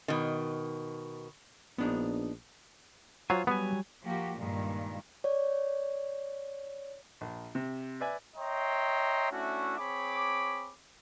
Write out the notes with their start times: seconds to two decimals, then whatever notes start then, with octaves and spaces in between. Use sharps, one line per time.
0.08 B2 D#3
1.78 A#1 B3 D4 D#4
3.30 F#3 F4 C5 G#5
3.47 F#3 G3 B3 G#5
4.04 F3 A#3 F#4 G4
4.38 G2 A#2 D#3 G#3
5.24 C#5 D5
7.21 A#1
7.55 C3
8.00 B4 D5 E5 G#5
8.37 C#5 D#5 E5 G5 A#5 C6
9.31 A3 C#4 D4 E4 F#4
9.78 C4 G#4 C#5 B5 D6